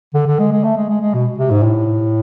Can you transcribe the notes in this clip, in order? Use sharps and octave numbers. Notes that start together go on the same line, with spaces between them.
D3
D3
G#3
G#3
A3
G#3
G#3
G#3
B2
C3
G#2
A2